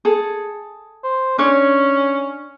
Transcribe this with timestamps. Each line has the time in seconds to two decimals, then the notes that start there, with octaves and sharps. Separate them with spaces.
0.05 G#4 A4
1.04 C5
1.38 C#4 D4 C#5